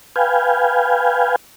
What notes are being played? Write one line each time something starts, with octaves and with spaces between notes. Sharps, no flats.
B4 F5 G5 G#5